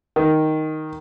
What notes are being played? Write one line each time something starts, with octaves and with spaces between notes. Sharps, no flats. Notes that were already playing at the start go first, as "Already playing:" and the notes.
D#3